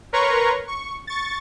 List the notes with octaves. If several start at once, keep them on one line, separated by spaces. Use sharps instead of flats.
A#4 B4 C#5 A#5 C6 C#6
C#6
C#6 A6